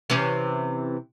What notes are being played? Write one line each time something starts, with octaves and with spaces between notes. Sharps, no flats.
C3 E3 C#4